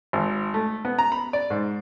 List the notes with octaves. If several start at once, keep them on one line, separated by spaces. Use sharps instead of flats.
G#1
A3
B3
A#5
B5
D5
G#2